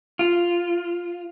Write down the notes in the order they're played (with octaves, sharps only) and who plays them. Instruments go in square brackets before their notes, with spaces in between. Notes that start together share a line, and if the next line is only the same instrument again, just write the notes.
[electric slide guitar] F4